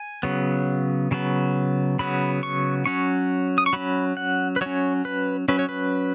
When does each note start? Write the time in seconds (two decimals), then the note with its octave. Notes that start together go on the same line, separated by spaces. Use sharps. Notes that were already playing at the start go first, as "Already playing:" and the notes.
Already playing: G#5
0.23 C#3 F#3 B3
1.11 C#3 F#3 B3
1.99 C#3 F#3 B3 B5
2.43 C#6
2.86 F#3 C#4 C#6
3.58 D#6
3.66 C#6
3.73 F#3 C#4 B5
4.17 F#5
4.56 B4
4.61 F#3 C#4 C#5
5.05 B4
5.48 F#3 C#4 B4
5.59 C#5
5.69 B4